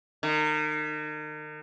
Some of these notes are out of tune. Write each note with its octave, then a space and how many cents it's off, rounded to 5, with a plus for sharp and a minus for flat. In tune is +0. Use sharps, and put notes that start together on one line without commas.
D#3 -35